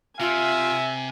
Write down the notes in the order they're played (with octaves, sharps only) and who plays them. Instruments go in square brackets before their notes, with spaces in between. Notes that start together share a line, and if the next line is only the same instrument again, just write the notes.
[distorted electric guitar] C3 [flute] F4 [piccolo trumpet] E5 [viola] G#5